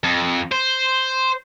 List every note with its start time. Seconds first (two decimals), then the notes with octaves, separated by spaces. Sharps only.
0.04 F2
0.52 C5